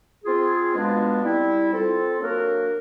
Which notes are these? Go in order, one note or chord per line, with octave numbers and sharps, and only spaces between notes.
C4 F4 G#4
B2 G#3 B3 D4 F4
G3 C4 E4
C4 F4 A4
F#3 A#3 D4 F#4 A#4